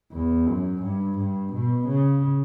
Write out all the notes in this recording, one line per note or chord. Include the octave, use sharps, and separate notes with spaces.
E2
F#2
G2
G2
B2
C#3